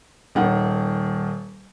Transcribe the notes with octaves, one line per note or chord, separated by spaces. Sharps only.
D#1 D#3 F#5